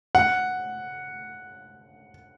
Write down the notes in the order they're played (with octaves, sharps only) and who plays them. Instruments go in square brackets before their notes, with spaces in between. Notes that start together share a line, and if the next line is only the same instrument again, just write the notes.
[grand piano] F#5